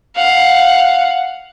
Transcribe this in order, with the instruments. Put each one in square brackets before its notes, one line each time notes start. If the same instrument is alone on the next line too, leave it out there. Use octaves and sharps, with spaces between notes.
[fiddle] F5 F#5